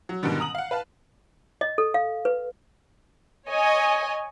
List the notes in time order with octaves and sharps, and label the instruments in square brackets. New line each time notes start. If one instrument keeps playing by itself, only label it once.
[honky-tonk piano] F#3
G#2 B2 D3 D#3 G3
A#5 D#6 F#7
F5 F#5
B4 F5 A5
[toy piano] D#5
A4
F5
B4
[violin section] C#5 D#5 G#5